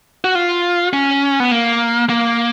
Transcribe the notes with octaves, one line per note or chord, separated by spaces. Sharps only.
F#4
F4
C#4
B3
A#3
A#3